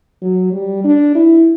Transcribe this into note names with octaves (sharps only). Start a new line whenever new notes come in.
F#3
G3
D4
E4